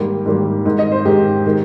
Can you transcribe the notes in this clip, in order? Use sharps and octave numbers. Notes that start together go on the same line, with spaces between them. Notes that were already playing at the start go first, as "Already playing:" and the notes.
Already playing: G#2 D#3 G3 A#3
G#2 D#3 G3 A#3
G#2 D#3 G#3
D#5
C5
G#2 D#3 G#3 G4
D#3 G#3